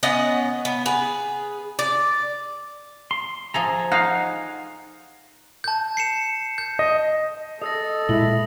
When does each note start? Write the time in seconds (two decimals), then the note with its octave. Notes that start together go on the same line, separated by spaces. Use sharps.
0.03 B3 C#4 D#5 F#5
0.65 B3
0.86 G#4 B4
1.79 D5
3.11 C6
3.54 F3 G#4 A4 G#5 A#5
3.92 D#4 F5 F#5
5.64 A5 G6
5.97 C7 C#7 E7
6.58 G6
6.79 D#5
7.62 A4 D#5 D#6 E6 A#6
8.09 A#2 G#3 E4 E5 F#7